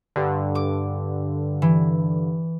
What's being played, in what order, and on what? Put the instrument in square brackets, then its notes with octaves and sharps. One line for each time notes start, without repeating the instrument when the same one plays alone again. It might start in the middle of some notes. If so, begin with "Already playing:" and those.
[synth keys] G2 D3
[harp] D6
E3